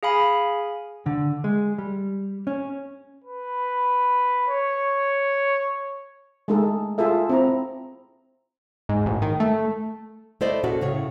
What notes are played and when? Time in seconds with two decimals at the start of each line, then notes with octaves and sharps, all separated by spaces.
0.03 G#4 F5 G#5 B5
1.06 D3
1.44 G#3
1.78 G3
2.47 C#4
3.24 B4
4.48 C#5
6.48 G#3 A3 D#4 G#4 A4
6.98 F4 G#4 A4 E5
7.29 C4 E4 A#5
8.89 G#2
9.06 A1
9.22 D#3
9.40 A3
10.41 A3 E4 C5 D5 D#5
10.64 A#2 C#4 F#4 A4
10.81 A2 C#3 C#5